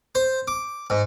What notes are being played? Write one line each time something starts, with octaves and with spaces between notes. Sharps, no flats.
C5
D6
G#2